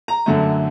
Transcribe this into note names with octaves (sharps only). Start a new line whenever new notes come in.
A#5
F#2 D3 F#3 A3